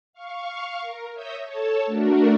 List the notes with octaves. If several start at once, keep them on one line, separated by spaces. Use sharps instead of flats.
F5 C#6
A#4
C#5 E5 D#6 E6 G6 A#6
A4 C#5 A5
A3 D4 F#4 A#4